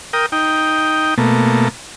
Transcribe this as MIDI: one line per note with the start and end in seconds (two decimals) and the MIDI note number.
0.13 0.26 70
0.13 0.26 79
0.13 0.26 87
0.32 1.14 63
0.32 1.14 79
1.18 1.68 47
1.18 1.68 57
1.18 1.68 58